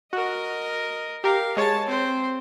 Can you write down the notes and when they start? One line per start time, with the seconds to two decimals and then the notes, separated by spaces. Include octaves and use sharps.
0.13 F#4 A#4 D#5
1.24 G4 A#4 F5
1.57 G#3 C#5 A5
1.87 C4 C5